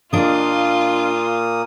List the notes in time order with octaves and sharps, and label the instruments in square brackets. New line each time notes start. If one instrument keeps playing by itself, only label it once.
[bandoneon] A#2 A#3 D#6 [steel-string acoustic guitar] D4 D#5 [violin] F4